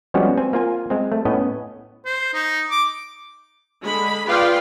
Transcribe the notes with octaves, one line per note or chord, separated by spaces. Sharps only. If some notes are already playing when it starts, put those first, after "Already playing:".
F3 G3 G#3 B3 C#4 F#4
C4 G#5
A#3 F4 G#5
G#3 C4
A3
A2 B3 C#4 D#5
C5
D#4
D6
D3 G#3 B5
F4 G#4 B4 D5 F5 G5